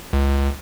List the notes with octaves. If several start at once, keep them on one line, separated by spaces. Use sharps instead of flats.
C#2